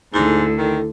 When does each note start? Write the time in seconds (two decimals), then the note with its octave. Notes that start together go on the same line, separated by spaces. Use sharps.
0.14 D2 G#2 D3 E4 A4
0.58 D#3